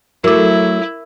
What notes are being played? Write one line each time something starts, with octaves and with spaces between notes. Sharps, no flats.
F#3 A3 E4 A#4 D6